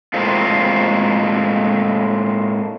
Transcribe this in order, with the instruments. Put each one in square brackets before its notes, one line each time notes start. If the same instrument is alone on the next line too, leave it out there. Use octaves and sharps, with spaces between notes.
[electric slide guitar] A2 G#3 A#3 C4 F4